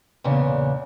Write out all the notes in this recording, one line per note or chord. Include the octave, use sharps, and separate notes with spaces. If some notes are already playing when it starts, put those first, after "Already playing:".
E2 A#2 C#3 D4